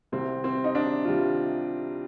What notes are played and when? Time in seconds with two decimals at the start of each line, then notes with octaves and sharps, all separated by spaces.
0.12 C2 C3 G3 C4
0.44 C4
0.64 D#4
0.75 D4
1.04 C3 G3 F4